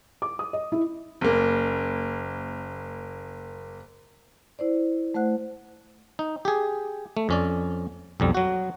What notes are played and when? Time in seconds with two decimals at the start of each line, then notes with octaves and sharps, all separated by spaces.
0.22 D6
0.39 D#6
0.53 D#5
0.72 E4
1.21 F#1 A#3
4.59 E4 C5 D5
5.14 A3 C5 F#5 F#6
6.19 D#4
6.45 G4 G#4
7.17 A3
7.29 F2 C#4 D5
8.20 B1 F2 G3
8.35 F#3 F#4